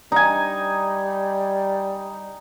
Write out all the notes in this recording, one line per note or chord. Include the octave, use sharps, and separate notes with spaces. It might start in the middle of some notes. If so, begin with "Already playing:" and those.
G3 D#4 G#5